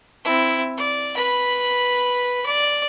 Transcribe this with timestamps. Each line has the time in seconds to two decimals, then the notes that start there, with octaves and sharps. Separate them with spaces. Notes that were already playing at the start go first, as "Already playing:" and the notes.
0.24 C4 E4
0.77 D5
1.16 B4 B5
2.46 D5